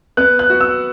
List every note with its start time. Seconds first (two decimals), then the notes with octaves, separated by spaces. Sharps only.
0.17 B3 F#6
0.39 F#6
0.50 F#4
0.61 E6